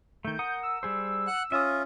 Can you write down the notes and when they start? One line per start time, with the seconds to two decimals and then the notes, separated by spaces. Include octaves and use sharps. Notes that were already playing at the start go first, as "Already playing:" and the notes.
0.25 D#3 A3 G6
0.39 A#4 F#5 D#6
0.63 E6
0.83 G3 G#4 C5
1.27 F#5 F#6
1.52 C#4 F4 E5 D#6